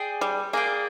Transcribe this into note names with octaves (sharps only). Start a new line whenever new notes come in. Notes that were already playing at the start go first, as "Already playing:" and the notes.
Already playing: G#4 D5 G5
G3
A#3 G#4 D5 G5